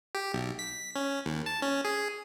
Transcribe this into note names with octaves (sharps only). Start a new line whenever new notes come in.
G4
B1
B6
C#4
D#2
A5
C#4
G#4